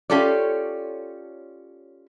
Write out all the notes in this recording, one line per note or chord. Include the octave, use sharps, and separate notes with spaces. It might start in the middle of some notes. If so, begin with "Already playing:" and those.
C#4 F4 G4 A4 C#5 D5